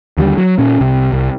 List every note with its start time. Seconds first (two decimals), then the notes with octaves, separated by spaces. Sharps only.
0.17 D#2 D3 F#3 G3
0.38 F#3
0.59 A#2 C#4
0.80 C2 C3
1.12 C2